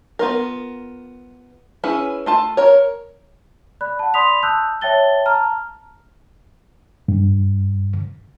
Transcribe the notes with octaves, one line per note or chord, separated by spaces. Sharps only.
B3 F4 A#4
C#4 E4 G#4 B4
A3 F4 A5
A#4 C#5
D5 B5 F#6
F#5 A5
D5 B5 C6 D#6 B6 F7
A5 D#6 E6 F#6 G6
C#5 E5 G5 A5 A6 G7
A5 A#5 F6
G2